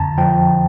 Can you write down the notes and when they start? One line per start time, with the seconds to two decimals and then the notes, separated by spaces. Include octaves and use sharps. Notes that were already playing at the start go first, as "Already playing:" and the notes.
Already playing: F2 D3 A5 A#5
0.18 F3 G5